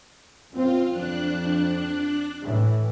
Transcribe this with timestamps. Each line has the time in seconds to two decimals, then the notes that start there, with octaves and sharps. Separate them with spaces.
0.52 F#2 C4 F4
0.91 F2 F3 D4 F#6
2.42 A2 E3